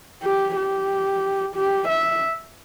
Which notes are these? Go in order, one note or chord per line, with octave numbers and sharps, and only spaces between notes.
G4
G4
G4
E5